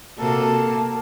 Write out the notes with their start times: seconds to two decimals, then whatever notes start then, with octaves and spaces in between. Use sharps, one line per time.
0.19 C3 A#3 F#4 A4 A5